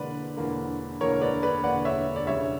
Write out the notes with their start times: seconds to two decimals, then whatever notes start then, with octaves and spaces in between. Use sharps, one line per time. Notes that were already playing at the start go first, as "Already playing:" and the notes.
Already playing: E1 E2 D3 A#3 B4 D5
0.37 E1 E2 D3 A#3
1.00 E1 E2 D3 A#3 A#4 C#5
1.21 B4 D5
1.42 B4 D5
1.64 E1 E2 D3 A#3 D5 F#5
1.85 C#5 E5
2.16 D5
2.27 E1 D2 C#3 G3 C#5 E5